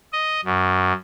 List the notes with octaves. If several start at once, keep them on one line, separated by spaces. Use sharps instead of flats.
D#5
F#2